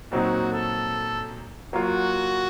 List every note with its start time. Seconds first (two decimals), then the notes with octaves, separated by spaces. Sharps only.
0.12 A#2 F#3 C4 D#4 F#4
0.52 A4
1.73 F#3 A#3 F4 F#4